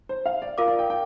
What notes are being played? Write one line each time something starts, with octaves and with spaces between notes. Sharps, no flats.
C5
F5
D5
F4 A#4 F5 D6
D5
G5
G5